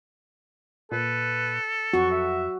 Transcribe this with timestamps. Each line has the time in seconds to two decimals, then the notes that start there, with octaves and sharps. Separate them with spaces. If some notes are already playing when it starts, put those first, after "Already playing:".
0.92 A#2 A4 B4
1.94 F2 F#4 C#6
2.11 E5